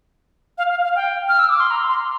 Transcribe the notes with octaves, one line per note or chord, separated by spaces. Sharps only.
F5
F5
F5
G5
F6
E6
D6
C6
A#5
C6